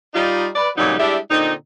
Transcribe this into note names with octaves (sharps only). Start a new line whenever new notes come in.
G3 D#4 F4
B4 D5
F2 A#2 C#3 F#3 G3 D#4
G3 G#3 D4 E4 G4 E5
A#2 D3 C4 D#4